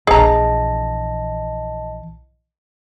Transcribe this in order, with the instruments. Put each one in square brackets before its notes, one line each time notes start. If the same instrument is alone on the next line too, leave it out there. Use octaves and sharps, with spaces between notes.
[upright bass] A#1 E3 [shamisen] G#4 A#5 [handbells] D#5 A5